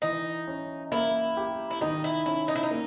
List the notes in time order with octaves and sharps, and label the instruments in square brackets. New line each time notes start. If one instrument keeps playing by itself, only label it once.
[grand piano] E3 [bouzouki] D#4
[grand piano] C#4
[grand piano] A#3 [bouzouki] E4
[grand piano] G4
[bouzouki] E4
[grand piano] D#3 [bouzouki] D#4
[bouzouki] E4
[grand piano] C#4 [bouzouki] E4
[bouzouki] D#4
E4
D#4
[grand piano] A#3